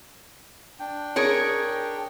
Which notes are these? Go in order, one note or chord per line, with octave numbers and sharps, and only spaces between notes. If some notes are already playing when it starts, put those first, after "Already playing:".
D4 G5
G#4 A#4 C#5